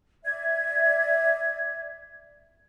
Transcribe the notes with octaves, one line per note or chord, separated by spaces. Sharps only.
D5 E5 G#6